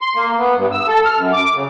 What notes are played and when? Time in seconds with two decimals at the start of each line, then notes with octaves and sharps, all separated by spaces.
0.01 C6
0.16 A#3
0.38 B3
0.57 G2
0.72 E6
0.88 A4
1.05 F6
1.17 F#2
1.33 D6
1.55 C#3